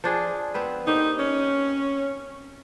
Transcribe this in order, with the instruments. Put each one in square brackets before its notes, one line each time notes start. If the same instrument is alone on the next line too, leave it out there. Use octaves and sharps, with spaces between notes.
[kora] F3 D4 G#4
B3 C4 B4
[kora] A#3 C4 G4 [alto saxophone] D#4
[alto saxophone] C#4 [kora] D#5